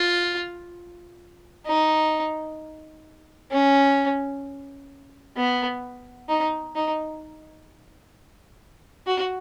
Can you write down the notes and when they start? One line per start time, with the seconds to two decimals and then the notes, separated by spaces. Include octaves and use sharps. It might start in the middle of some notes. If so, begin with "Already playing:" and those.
Already playing: F4
1.66 D#4
3.51 C#4
5.36 B3
6.29 D#4
6.75 D#4
9.06 F#4